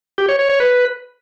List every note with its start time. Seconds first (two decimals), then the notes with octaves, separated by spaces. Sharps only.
0.18 G4
0.29 C#5
0.39 C#5
0.50 C#5
0.60 B4